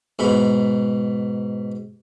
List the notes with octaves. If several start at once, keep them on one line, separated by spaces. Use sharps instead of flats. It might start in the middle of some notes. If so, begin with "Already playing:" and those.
G#2 B2 B5